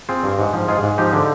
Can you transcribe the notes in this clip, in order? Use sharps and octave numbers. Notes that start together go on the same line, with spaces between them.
C4 F4 G#4
G2
G#2
F3
G#2 F4 G#4
G#2
F3 D#4 G4
D3